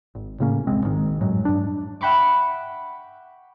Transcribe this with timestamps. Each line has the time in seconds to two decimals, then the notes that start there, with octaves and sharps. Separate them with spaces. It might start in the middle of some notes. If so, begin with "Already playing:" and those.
0.15 G#1
0.40 A2 C#3 A#3 C#4
0.67 E1 C2 G#3 C4
0.84 G#1 G#2 D#3
1.21 F#2 A2 F#3 G#3
1.45 G2 D4
2.01 E5 F#5 G5 B5 C#6 D6